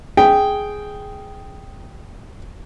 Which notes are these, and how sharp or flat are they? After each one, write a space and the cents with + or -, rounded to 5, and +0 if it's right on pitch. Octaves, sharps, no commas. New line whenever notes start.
G#4 +0 G5 -5